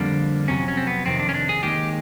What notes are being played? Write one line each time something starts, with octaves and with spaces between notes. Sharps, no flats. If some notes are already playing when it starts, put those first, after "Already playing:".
Already playing: F2 D3 G3 A#3 D4
F2 C3 D#3 F#3 C#4
C#4
C4
B3
F2 C3 D#3 C4
D4
C#4
D4
G#4
D#2 D#3 G#3 G4